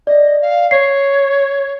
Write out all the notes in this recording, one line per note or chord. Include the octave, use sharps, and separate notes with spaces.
D5 D#5
F5
C#5 C7